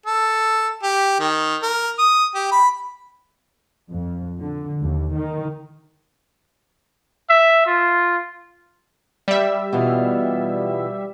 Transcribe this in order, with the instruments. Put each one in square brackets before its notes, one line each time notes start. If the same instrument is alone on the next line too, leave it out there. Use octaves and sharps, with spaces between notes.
[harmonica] A4
G4
D#3
A#4
D#6
G4
B5
[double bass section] F2
D3
D#2
D#3
[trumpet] E5
F4
[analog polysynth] G3 E5
[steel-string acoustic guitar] B2 E3 F4